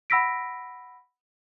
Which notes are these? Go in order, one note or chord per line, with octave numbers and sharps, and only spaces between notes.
F#5 B5 E6 A#6 B6 D7